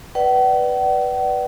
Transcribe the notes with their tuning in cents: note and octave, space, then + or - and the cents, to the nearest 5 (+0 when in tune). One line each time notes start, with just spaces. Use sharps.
B4 +0 D5 +10 F#5 +45